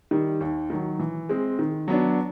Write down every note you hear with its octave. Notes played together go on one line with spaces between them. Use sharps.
D#3 G3
D#2
D#3 F#3
E3
G#3 C4
D#3
F#3 B3 D4